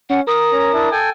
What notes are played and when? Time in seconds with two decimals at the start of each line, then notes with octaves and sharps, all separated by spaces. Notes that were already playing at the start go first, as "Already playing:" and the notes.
0.10 C#4 F#5
0.27 A#4 D#6
0.52 C#4 A#5
0.73 D4 E4
0.92 A4 G5 G#5